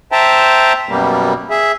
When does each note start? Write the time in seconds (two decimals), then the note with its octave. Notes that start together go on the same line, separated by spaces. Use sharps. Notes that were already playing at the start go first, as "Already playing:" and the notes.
0.12 C5 E5 G5 A5 A#5
0.89 F#2 B2 G3 A#3
1.50 G#4 E5